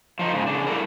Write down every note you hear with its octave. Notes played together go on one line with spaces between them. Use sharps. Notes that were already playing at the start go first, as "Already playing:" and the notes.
F3 D#4
G#2 C#3
C#3 D4
G3 A3 E4 A4 A#4